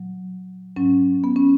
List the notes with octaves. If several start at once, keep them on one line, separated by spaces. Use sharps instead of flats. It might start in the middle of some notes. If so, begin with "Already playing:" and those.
Already playing: A#2 F#3
G#2 F#3 C#4
B3
C#4